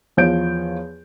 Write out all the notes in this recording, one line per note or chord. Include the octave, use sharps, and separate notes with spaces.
E2 F3 C#5 G6 D7